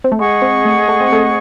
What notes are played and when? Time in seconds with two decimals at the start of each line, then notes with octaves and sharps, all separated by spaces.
0.04 C4
0.12 A3
0.19 G#3 G#4 D#5 F#5 C#6
0.42 C4
0.65 A3
0.88 A3
1.00 C4
1.12 A3